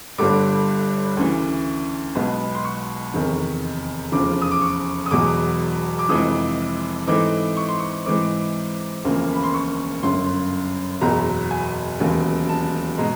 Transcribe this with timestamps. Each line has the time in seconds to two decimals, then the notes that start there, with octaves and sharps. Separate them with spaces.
0.18 G1 G2 D3 G3 D6
1.17 D2 C#3 E3
2.15 B1 B2 G#3 B3
2.55 C6
2.64 C#6
3.14 F1 E2 C3 D#3
4.12 F1 E2 C#3 F3 D6
4.42 D#6
4.51 D6
4.61 C#6
5.06 D#6
5.11 E1 E2 B2 F#3 D6
5.99 D6
6.09 F1 F2 C3 E3 G#3 D#6
7.07 G#2 E3 A3 C4 D#4 D6
7.57 C#6
7.68 C6
7.80 C#6
8.06 G#2 E3 G#3 C4 D6
9.05 E1 D2 C#3 F3 A#3
9.33 B5
9.43 C6
9.54 C#6
10.03 G1 F#2 C#3 C6
11.01 F#1 E2 B2 F#3 A#5
11.51 G#5
12.00 E1 D#2 C#3 F#3
12.49 A5
12.98 B2 G#3 A#5